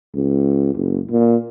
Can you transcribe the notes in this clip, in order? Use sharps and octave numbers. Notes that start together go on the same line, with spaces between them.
C#2
F#1
A#2